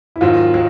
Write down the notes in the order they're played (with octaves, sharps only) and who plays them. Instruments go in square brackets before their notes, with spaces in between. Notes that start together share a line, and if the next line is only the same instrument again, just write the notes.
[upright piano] E4
[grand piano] G#2 D#3 F#3 A#3 [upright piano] F4
[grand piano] D#3 F#3 A#3